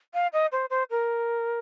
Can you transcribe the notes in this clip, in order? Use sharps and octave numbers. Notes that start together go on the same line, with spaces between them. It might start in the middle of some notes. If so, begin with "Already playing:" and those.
F5
D#5
C5
C5
A#4